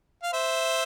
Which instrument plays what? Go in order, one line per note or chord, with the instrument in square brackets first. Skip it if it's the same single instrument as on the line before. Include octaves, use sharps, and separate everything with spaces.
[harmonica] F5
C5 E5